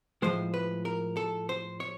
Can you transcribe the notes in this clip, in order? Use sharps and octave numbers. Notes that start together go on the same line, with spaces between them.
A2 F3 G#3 C5
B4
A#4
A4
C5
C#5